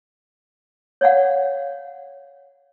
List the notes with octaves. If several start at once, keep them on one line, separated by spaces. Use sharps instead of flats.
C#5 D5 F5 F#5